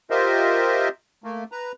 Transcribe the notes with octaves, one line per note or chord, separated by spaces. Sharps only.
F4 G4 A#4 C5 D#5 E5
A3 A#3
B4 A#5